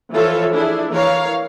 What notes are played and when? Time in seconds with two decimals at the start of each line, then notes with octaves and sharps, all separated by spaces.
0.11 E3 F3 F4 A4 C#5 E5
0.52 D4 E4 G#4
0.90 E3 A#4 C#5 F5